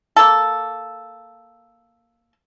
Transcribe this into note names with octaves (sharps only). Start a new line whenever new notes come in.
A#3 A4